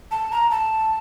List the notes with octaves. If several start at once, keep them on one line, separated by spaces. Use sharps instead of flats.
A5
A#5
A5